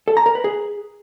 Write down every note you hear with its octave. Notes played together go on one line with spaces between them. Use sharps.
A4
A#5
A#4
B4
G#4